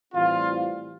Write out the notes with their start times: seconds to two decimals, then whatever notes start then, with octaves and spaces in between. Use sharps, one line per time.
0.13 A2 E3 G3 C4 F4